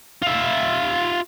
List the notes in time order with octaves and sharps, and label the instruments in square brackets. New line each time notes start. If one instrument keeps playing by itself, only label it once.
[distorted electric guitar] F4 E5